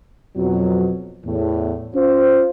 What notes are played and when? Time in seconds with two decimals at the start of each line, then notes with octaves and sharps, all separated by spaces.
0.37 F2 B2 F#3
1.25 E2 A2
1.95 C#4 F4 C5